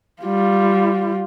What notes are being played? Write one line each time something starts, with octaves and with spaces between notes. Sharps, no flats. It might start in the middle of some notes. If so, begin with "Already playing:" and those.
G3 F4